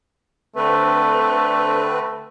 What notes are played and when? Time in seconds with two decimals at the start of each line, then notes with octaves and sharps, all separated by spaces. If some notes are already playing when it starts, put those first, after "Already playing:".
0.56 D3 A3 C4 B4